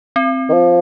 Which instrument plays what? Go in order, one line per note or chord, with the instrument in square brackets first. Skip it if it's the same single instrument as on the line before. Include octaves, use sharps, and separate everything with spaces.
[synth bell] C4
[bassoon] D#3
F3